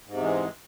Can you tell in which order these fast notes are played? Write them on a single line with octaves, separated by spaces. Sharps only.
G#2 C3 E2 G#3